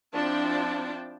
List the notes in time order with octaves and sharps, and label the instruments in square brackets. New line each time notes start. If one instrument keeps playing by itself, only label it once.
[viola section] F3 C4 D4 E4 G5 A5